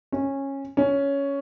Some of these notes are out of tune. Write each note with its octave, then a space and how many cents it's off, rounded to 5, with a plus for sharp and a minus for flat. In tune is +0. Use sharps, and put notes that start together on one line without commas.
C#4 -15
C#4 +10